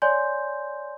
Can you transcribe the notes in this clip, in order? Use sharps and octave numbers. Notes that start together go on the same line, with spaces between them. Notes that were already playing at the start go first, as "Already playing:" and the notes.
C#5 D5 G#5 C6 G6